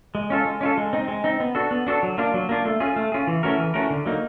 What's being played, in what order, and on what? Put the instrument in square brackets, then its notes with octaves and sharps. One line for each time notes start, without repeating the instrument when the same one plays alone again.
[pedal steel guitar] G#3
C#4 F4 A4
G#3
C#4 F4 A4
G#3
C4 D#4
G#3
C4 D#4
B3
D4 F#4 A4
B3
D4 F#4 A4
F#3
A#3 D4 F4
F#3
A#3 D4 F4
A3
C#4 F4 G#4
A3
C#4 F4 G#4
E3
A3 C#4 F#4 A#4
E3
A3 C#4 F#4 A#4
D3
F#3 A#3 D#4